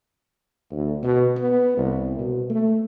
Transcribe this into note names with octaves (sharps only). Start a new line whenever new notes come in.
D2
B2
B3
C2
B2
A3